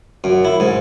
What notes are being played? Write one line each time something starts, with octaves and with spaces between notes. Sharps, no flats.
F#2
E4
G#2